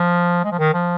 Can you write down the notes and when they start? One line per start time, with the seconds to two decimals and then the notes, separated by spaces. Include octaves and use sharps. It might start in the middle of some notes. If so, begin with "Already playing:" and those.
Already playing: F3
0.44 G#3
0.52 F3
0.59 D#3
0.74 F3